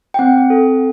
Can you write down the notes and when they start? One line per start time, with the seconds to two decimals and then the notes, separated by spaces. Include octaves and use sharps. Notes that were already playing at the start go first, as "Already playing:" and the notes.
0.14 G5
0.19 C4 F#5
0.50 A4